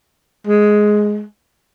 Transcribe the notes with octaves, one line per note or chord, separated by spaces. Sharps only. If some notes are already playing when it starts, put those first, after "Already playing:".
G#3